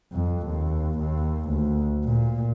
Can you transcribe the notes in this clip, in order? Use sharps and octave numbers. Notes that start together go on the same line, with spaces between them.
F2
D#2
D#2
D2
A#2